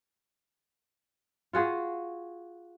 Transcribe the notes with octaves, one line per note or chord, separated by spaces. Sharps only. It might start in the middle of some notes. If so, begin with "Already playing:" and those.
F4 F#4 G#4